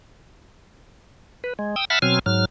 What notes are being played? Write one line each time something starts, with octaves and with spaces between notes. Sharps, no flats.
B4
G#3
G5 D#6 E6
E5 F#5 A5 B5 F6
B2 F#3 C4 G#5 F6
G#2 F#3 F6